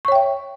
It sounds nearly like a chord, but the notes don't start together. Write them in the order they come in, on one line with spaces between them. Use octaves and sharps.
C#6 C#5 G5 E5